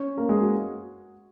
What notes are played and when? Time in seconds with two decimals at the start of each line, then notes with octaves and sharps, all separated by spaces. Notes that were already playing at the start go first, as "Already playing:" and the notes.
Already playing: C#4 C#5
0.17 A#3 A#4
0.29 G#3 G#4
0.41 F#4